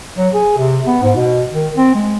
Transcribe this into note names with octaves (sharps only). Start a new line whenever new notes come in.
F#3
G#4
C3
B3
G#2
B2
D#3
C4
G#3